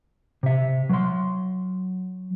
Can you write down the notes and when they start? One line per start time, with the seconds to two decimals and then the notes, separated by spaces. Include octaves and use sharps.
0.43 C3 E5
0.90 F#3 C6